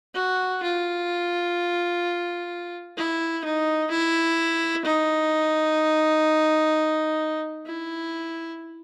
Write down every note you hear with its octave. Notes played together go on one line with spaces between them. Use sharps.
F#4
F4
E4
D#4
E4
D#4
E4